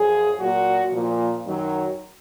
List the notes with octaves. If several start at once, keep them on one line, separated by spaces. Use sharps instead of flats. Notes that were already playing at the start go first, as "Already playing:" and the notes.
Already playing: F#2 F3 G#4
A#2 F#3 F#4
A#2 F3
F#2 D#3 F#3